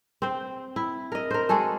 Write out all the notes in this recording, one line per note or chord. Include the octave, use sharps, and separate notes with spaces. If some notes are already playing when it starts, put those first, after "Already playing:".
C4 C5
E4
A#4 D#5
A#4 C5
G#3 F#4 G#4 A4